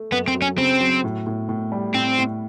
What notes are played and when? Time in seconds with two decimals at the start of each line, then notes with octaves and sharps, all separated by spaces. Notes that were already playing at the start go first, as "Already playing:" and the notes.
Already playing: A3
0.12 F#2 B3
0.28 C4
0.35 F#3
0.42 C#4
0.58 C#3 C4
0.80 F#3
1.04 A2
1.27 A2
1.49 A2
1.72 G3
1.95 A2 C4
2.18 A2